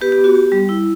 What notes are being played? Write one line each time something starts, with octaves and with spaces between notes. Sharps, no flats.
B3 G4 B4
G4
B3
F#4
B3 G4
G3
E4